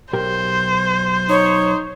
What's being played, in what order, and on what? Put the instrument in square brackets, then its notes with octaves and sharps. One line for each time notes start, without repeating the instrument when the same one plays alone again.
[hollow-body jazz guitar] B1 G4 A#4 [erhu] C5
[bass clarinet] D#4 [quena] C#5